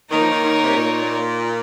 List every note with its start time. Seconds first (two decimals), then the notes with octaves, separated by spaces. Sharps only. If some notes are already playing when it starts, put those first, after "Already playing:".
0.10 D#3 A#3 D#4 A#4 C#5
0.21 F3
0.31 D#3
0.43 D#3
0.63 C3
0.76 A#2